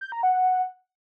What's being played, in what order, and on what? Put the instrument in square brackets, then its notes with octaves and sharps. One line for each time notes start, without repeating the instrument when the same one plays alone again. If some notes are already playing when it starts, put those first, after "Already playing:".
[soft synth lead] G6
A#5
F#5